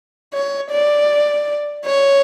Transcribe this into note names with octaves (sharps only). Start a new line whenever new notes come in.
C#5
D5
C#5